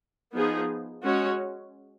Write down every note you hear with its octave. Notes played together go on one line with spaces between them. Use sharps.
F3 B3 D#4 G#4
G#3 C#4 F#4 C#5